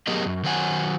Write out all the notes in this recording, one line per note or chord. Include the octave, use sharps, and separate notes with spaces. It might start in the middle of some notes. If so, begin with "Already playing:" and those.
F#3 B3 G4 G#4 A#4 D#5
F#2
D#3 F#3 C5 F#5 G#5